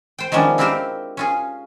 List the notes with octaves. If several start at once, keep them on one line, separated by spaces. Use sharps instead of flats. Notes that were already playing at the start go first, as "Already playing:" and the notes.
C5 G5
D#3 F3 G#3 B3 C#4 D4
C4 E4 F4 G4 A#4 C5
C#4 F4 G#4